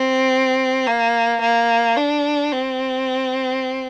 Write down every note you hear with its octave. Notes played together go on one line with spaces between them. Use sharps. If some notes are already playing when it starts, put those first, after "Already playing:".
Already playing: C4
A#3
A#3
D4
C4